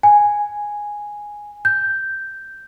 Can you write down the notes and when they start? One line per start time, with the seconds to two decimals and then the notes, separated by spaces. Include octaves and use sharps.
0.03 G#5
1.65 G6